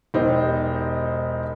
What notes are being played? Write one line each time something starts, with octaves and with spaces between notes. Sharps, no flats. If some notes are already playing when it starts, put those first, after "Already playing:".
E1 D#4 G4 C5